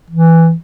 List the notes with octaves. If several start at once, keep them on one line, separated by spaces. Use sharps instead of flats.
E3